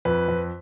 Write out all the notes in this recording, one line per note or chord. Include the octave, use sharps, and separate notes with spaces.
F2 B4
F2